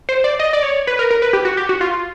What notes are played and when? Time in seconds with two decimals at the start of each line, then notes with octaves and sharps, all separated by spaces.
0.09 C5
0.24 D5
0.40 D#5
0.53 D5
0.63 C#5
0.87 B4
0.99 A#4
1.11 A#4
1.22 B4
1.33 G4
1.45 F#4
1.57 G4
1.69 F#4
1.81 F4